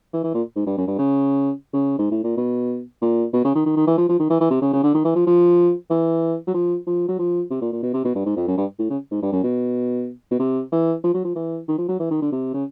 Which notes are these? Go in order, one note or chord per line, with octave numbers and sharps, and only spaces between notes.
E3
E3
A#2
G#2
G2
F#2
G2
C#3
C#3
G#2
A2
A#2
B2
A#2
B2
C#3
D#3
D#3
D#3
E3
F3
F3
D#3
E3
E3
C3
C#3
C#3
D3
D#3
E3
F3
F3
E3
F#3
F3
F3
F#3
F3
C3
A#2
A#2
B2
C3
B2
G2
G#2
F2
F#2
G2
A2
C#3
G#2
G2
F#2
B2
B2
C3
E3
F3
F#3
F3
E3
D#3
F3
F#3
E3
D#3
D3
C3
C#3